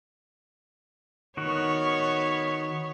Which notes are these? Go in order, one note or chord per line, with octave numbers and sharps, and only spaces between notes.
D#3 B3 F#4 C#5